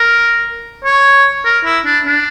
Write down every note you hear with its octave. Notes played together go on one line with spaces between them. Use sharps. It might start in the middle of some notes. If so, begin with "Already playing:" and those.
Already playing: A#4
C#5
A#4
E4
D4
D4